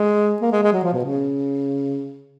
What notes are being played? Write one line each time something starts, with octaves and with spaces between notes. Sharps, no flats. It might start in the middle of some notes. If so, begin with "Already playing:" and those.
Already playing: G#3
A#3
G#3
G#3
F#3
F3
B2
C#3